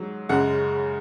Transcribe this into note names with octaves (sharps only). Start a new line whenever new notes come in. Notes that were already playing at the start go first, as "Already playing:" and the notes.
Already playing: G#2 F#3
F#2 C#3 G#3 F#5